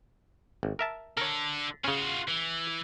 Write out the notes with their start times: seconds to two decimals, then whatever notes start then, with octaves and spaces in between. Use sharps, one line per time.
0.63 G#1
0.79 A#4 E5 A5
1.17 D3 A4 A#4 C#5
1.84 C#3 C#4 F4 F#4
2.28 E3